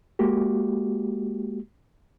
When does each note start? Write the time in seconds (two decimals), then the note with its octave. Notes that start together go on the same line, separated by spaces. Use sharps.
0.19 G#3 A#3 F#4 G4